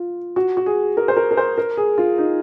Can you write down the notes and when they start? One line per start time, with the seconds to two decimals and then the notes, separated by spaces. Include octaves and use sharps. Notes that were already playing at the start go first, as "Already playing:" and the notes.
Already playing: F4
0.36 F#4
0.57 F#4
0.66 G#4
0.97 A#4
1.08 C5
1.17 A#4
1.31 A#4
1.37 C5
1.58 A#4
1.77 G#4
1.98 F4
2.18 D#4